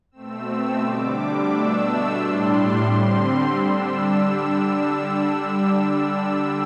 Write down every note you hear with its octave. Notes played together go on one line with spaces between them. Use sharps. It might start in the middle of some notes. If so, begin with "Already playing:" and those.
B2 A3 C4 E6
E6
D3 G3 D4 D6
B2 A3 D4 E6
A2 G3 D4 C6
C6
D3 G3 C4 C6
D3 G3 D4 E6